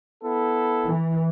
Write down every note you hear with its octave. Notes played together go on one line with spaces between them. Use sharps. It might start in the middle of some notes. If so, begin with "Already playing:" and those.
B3 E4 A4
E3